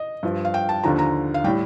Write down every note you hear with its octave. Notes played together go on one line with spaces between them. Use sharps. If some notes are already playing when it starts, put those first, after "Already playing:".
Already playing: D#5
G2 F3
F5
G5
A5
D#2 D3 F3 A#5
A#5
F5
A2 G3 G5